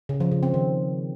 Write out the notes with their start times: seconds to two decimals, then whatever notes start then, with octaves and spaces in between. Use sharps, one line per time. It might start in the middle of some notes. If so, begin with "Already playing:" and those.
0.09 C#3
0.20 F3
0.32 C#3
0.43 C4
0.54 D#3